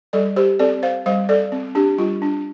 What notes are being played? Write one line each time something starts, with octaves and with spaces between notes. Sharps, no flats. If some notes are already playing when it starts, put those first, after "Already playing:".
G3 A4 D5
G4 C5
C4 A4 D5
C5 F5
G3 C5 F5
A4 D5
C4
D4 G4
G3 F4
D4